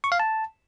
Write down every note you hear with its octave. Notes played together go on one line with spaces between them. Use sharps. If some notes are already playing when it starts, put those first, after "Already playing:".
C#6
F5
A5